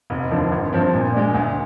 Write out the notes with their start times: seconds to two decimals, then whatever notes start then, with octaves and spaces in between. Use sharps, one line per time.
0.10 F1
0.31 D#2 D3 F3
0.51 G#1
0.73 G2 F3 C4
0.93 A#2
1.13 G#3 D4
1.34 D2